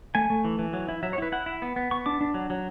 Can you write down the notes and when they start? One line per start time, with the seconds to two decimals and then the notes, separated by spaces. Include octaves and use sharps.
0.15 A3 G#5
0.30 A3
0.45 E3
0.59 E3
0.73 F#3
0.89 E4
1.03 F#3 E5
1.13 C#5
1.18 E4 B4
1.32 E4 F#5
1.46 E4
1.62 B3
1.76 B3
1.91 B3 C#6
2.06 D4 D6
2.21 D4
2.34 F#3
2.50 F#3